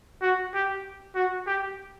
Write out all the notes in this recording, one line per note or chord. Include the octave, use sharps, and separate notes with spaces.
F#4
G4
F#4
G4